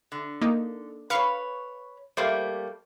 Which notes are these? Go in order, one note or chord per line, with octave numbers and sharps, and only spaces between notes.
D3
A#3 D#4
B4 C#5 F5 C#6
G3 A3 A#3 C5